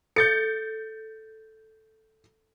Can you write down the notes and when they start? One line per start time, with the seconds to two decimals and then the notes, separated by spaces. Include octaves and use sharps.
0.16 A4 G6 A6 C#7